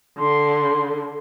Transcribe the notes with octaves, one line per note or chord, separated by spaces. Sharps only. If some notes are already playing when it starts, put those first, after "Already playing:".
D3 C6